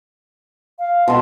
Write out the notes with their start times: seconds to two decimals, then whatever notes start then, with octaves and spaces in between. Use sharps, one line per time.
0.79 F5
1.08 B2 A5 C6